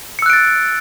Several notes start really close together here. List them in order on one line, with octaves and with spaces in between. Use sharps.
C#7 E6 F#6 D7 A6